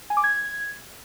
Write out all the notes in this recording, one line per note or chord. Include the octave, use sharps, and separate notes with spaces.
G#5
D6
G#6